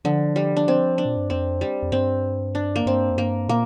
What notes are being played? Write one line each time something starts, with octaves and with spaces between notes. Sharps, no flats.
D3 F3
G3
D4
C4
D4
A#2
G2
F2 C4
G3
F2
G2 C4
D4
A#3
G2 C4
F2
G2 A#3
A#2 A#3